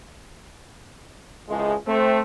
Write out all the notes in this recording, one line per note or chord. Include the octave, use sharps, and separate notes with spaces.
C#2 A2 C3 F3 G#3
A3 C4